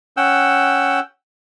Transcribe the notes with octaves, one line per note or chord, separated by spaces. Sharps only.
C#4 F#5 G5 E6